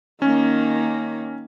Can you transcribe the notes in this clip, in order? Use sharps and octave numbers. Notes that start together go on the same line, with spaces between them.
D#3 A#3 C#4